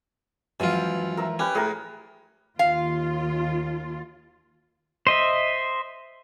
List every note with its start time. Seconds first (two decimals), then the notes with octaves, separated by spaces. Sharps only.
0.60 F#2 E3 F3 G#3 F4
1.17 A#4 E5
1.39 C#4 G4 B4
1.55 A2 G#4 A#4
2.59 D#2 F4 F5
5.07 C5 D#5 E5